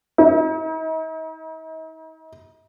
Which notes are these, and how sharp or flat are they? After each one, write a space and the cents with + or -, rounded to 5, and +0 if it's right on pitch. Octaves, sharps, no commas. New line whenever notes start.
D#4 +45